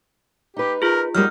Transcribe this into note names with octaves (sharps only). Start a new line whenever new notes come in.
D#4 G4 B4
F4 G#4 A#4
F#3 G3 A#3 D#4 F6